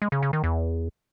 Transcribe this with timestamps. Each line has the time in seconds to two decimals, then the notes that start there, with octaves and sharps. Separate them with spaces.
0.02 G#3
0.12 C#3
0.23 C#3
0.33 D#3
0.44 E2